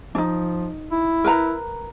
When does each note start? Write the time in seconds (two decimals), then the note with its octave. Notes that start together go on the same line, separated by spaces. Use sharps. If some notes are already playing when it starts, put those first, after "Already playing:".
0.15 F3 D4 D#4
0.92 E4
1.24 A#4 B4 A#5